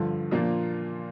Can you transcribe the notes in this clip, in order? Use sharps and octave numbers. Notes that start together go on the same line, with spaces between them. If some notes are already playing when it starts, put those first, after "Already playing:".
Already playing: G2 D3 F3
A#2 F3 A#3 D4 F4